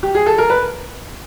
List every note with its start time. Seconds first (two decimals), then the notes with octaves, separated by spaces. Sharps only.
0.03 G4
0.15 G#4
0.26 A4
0.38 A#4
0.50 B4